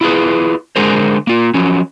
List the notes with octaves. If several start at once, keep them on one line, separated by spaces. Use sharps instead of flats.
E4 F4 G#4 B4
D3 G#3 G#4 A#4 C5
A#3 F4
F3 F#3 C#4